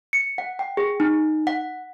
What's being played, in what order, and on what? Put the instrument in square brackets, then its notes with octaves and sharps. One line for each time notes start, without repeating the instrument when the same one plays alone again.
[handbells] C#7
F#5
G5
G#4
D#4
F#5